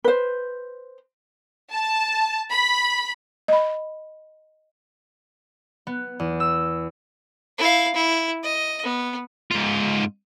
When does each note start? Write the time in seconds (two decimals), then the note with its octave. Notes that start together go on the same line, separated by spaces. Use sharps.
0.04 B4 C5
1.72 A5
2.51 B5
3.48 D#5 B5
5.87 B3
6.19 E2
6.40 E6
7.58 E4 F5
7.94 E4
8.43 D#5
8.83 B3
9.51 G#2 F4